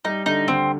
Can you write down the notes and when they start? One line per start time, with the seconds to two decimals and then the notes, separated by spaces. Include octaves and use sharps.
0.05 G3 D#4
0.26 D3 D#4
0.47 D2 C4